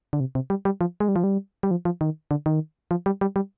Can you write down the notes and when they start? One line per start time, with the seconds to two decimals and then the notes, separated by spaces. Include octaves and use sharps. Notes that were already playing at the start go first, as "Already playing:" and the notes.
0.13 D3
0.20 C3
0.35 C3
0.50 G3
0.65 G3
0.81 F3
1.00 G#3
1.08 G3
1.16 F3
1.24 G3
1.63 G3
1.71 F3
1.85 F3
2.01 D#3
2.31 D3
2.46 D#3
2.91 F3
3.06 G3
3.21 G3
3.36 G3